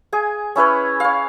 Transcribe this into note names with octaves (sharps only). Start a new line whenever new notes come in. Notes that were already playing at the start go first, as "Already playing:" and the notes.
G#4 G#5
C#4 E4 B4 C#5
C#5 F5